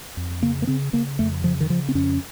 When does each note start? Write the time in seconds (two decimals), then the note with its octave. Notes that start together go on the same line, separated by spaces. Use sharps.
0.17 F2
0.42 C#3 A#3
0.62 A#3
0.67 C#3 C4
0.93 C#3 A#3
1.19 F2 A3
1.44 C#3 F3
1.60 D#3
1.69 C#3 F3
1.89 C4
1.95 F2 C#4